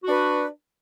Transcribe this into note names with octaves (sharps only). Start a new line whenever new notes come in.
D4 F#4 B4